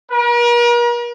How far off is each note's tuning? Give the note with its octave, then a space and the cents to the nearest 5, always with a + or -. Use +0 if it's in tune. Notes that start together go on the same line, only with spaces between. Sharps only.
A#4 +45